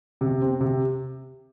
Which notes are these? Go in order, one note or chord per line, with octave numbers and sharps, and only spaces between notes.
C3
C4
C3